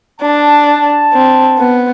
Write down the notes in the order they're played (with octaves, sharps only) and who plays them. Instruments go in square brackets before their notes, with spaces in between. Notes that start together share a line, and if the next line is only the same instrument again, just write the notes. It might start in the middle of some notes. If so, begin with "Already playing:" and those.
[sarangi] D4 [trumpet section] A5
[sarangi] C4
B3